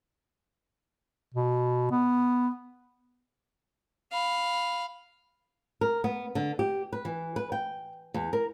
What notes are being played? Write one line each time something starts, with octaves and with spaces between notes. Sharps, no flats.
B2
B3
F5 B5
A#4
B3
D3
G4
B4
E3
B4
G5
E2
A#4